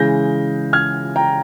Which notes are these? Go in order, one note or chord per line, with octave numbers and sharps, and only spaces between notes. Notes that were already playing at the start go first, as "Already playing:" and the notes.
Already playing: C#3 E3 G#3 G6 A#6
F6 G#6
G5 A#5